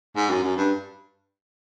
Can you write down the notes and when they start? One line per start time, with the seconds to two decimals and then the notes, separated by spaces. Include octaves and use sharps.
0.16 G#2
0.30 F#2
0.43 F#2
0.57 G2